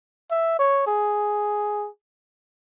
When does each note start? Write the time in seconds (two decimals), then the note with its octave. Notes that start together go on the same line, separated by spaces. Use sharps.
0.31 E5
0.59 C#5
0.87 G#4